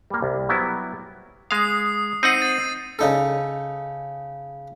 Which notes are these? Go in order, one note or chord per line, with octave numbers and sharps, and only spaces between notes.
G3 A#3
C2
F#3 G3 B3 E4
G#3 F5 D#6 C7
C4 D#4 F#5 C7 D#7
A6
C#3 D#4 A4